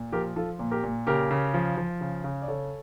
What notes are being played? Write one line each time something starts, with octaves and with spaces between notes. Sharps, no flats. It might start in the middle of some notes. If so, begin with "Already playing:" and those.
Already playing: A#2
F3 G4 A#4
F3 F4 A4
A#2
G4 A#4
A#2
C#3 G4 A#4
C#3
F3
F3
C#3
C#3
D5
C#3 A4 C#5